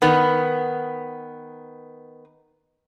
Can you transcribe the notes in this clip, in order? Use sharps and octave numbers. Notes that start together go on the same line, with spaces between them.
D#3 B3